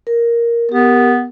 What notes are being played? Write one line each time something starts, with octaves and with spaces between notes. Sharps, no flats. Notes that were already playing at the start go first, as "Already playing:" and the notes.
A#4
B3 G4 A#4